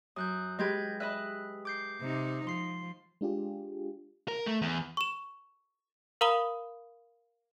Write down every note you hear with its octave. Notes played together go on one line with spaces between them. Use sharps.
F#2 D#6 F#6 G6
G#3 G4 B4 D#5 G6 G#6
B4 D#5 E5 F#6
D6 G6 C7
C3 D#4
F3 C6 C7
G#3 D4 F4 G4 G#4
A#4
A3
E2
C#6 E7
A#4 F5 A#5 B5 D#6 G7